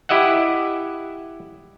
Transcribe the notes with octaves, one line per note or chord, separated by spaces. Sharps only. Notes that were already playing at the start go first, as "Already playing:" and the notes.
E4 G4 D#5 E5 F#5